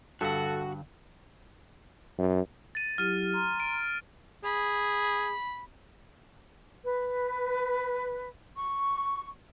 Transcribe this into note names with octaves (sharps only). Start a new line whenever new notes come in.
G2 D3 F#4 A4 F5 F#5
F#2
A6 D#7
F#3 E4 G4 F6 D#7
A#5 C6
D7
G#4 B5
B4
C#6